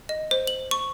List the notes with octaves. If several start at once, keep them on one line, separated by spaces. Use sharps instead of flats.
D#5
C5
F#7
C#6